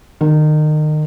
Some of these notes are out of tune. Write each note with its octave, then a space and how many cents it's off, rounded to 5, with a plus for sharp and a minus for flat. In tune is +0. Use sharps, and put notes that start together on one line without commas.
D#3 -30